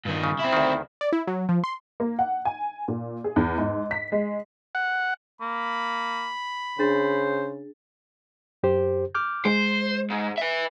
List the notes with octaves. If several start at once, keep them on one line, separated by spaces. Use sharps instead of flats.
G2 D#3
C#3
C4 E4
D2 D#3
D5
E4
F#3
F3
C6
A#3
F#5
G#5
A#2
G#4
E2
G#2
B6
G#3
F#5
A#3 B5
C#3 D4 G#4 C5 A6
F#2 G4 C5
D6 F6 G6
G#3 C5
G#2
B4 E5